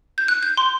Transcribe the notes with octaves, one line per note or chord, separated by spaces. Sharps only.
G6
F#6
G6
C6